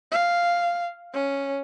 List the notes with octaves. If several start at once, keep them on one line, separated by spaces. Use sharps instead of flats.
F5
C#4